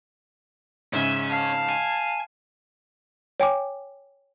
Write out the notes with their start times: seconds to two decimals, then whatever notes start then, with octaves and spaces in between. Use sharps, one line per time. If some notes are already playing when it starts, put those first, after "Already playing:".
0.93 G#2 C#3 C#4 E5
1.30 F5 A5
1.69 G#5
3.40 C#5 G5 G#5 D6